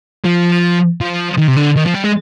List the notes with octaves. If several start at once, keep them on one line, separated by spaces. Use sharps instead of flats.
F3
F3
D#3
C3
D3
D#3
F3
G3
G#3